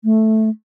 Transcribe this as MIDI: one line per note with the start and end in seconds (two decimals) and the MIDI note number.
0.04 0.49 57